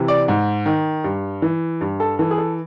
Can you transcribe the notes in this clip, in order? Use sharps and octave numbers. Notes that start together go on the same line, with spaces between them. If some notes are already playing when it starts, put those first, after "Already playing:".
Already playing: C3 E3
D5
G#2
D#3
G2
E3
G2
A4
E3 A4
G#4
A4